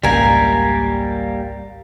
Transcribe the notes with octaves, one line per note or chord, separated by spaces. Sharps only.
G#1 C#2 G3 A#3 A#4 G#5